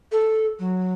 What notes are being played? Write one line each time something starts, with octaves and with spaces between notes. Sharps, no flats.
A4
F#3